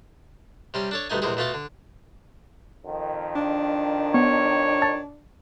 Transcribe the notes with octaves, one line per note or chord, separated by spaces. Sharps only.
C3 G3 C#4 C6
D4 A4 C#5
D2 G2 A3 D#4 G#5
A#1 E2 C3 G#3 G#4
B2 A3 F4 A4
D3
F2 D#3
D4
B3 C#5
A5 A6